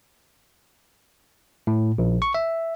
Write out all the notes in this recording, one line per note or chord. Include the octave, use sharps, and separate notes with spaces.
A2
A#1
C#6
E5